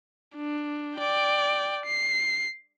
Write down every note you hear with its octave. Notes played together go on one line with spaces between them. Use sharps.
D4
D5 G5
C7